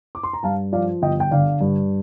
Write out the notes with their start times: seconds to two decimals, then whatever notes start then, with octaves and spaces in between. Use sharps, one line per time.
0.15 D6
0.23 C6
0.33 A#5
0.43 G2 F5 A5
0.72 F3 D5 F5
1.02 G1 D#5 G5
1.20 G5
1.31 D3 D5 F5
1.61 G2